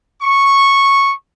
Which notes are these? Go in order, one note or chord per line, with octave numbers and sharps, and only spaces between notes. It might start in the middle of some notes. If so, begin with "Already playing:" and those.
C#6